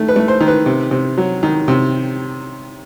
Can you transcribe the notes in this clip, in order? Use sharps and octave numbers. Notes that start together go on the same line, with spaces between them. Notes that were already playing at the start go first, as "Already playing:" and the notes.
Already playing: D#3 A3 A4
B4
A3
C5
D#3
B4
C3
C3
F#3
D#3
C3